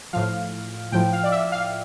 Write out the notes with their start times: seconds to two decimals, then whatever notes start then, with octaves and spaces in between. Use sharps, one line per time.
0.13 A2 F3 F5
0.92 A2 F3 G5
1.13 F5
1.24 D5
1.32 E5
1.52 F5